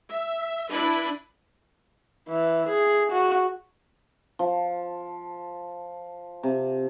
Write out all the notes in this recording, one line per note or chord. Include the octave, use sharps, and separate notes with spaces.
E5
D4 E4 B4 B5
E3
G#4
F#4
F3
C3